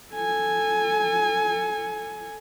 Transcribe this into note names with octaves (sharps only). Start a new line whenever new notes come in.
A4 G#5